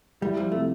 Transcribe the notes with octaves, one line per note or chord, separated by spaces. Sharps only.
G3 E4
F3 G3
C3 A3